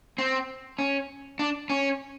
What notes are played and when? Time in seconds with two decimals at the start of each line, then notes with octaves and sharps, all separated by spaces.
0.18 C4
0.79 C#4
1.39 D4
1.70 C#4